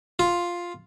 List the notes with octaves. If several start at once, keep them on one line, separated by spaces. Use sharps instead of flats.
F4